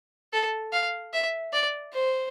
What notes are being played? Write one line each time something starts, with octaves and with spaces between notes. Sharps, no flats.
A4
F5
E5
D5
C5